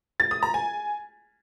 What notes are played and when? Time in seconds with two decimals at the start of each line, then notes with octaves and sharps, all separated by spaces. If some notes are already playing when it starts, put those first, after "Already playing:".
0.20 A6
0.31 D#6
0.43 A#5
0.54 G#5